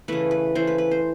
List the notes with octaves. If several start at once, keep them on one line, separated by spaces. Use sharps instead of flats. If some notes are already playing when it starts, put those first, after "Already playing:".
C#3 E3 A3 B4
B4
C#3 E3 A3 C5
B4
B4
C5